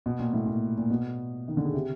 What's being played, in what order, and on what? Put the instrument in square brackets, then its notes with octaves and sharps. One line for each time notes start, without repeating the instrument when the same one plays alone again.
[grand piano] B2
A#2
A2
A#2
A#2
B2
D#3
D3
C#3
C3